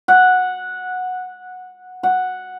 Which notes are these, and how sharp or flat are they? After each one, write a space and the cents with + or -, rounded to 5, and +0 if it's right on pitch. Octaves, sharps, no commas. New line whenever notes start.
F#5 -10
F#5 -5